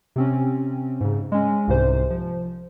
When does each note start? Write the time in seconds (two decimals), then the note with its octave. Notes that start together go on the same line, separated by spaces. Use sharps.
0.16 C3 C4 C#4
1.01 G#2 C#3
1.32 G#3 C#4
1.67 C2 G#2 C3 C5
2.10 F3